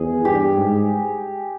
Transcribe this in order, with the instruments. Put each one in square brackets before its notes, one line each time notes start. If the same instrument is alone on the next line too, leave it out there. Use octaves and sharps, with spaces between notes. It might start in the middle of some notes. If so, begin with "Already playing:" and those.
Already playing: [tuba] E2 [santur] G#4
[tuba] G2 [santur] G4
[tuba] G#2